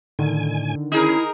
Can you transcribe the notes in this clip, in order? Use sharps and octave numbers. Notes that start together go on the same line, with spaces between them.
A2 D3 D#3 G#5
C#4 D#4 E4 G#4 A#4